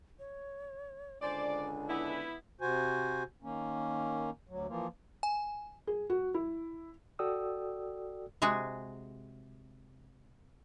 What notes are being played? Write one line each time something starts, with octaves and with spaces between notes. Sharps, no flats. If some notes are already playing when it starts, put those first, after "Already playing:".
C#5
C#2 D3 D4 C5 D5 G#5
B3 E4
C3 F#4 C5 G#5
D#3 A#3 C#4
D2 F#3
E3 F3 A#3
G#5
G#4
F#4
E4
F#4 A4 D5 G5 D#6 E6
C3 G#3 F#4 G#4